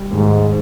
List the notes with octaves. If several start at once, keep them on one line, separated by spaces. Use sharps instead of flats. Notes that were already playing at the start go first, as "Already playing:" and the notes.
Already playing: G3
D#2 G#2